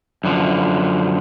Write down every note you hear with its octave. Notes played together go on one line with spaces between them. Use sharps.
F#2 D3 F3